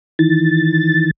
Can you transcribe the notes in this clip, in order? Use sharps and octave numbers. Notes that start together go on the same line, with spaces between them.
D#3 E3 A6